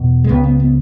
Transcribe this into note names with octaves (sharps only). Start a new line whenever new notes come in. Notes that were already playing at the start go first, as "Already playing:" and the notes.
Already playing: E2 B2
G#3
C#2 C#3 B3
B3
B3